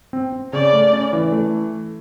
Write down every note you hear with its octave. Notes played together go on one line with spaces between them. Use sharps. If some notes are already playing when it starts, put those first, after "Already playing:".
C4
C4
C#3 D5
A3
C#4
E3
A3